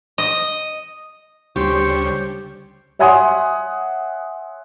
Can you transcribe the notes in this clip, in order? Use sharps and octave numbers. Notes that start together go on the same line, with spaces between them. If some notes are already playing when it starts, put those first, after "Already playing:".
D#5
D2 C#3 G3 G4 C5 C#6
C#5 E5 F#5 G#5 C6 D#6